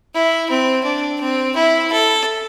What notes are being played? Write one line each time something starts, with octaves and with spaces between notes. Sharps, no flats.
E4
C4
D4
C4
E4
A4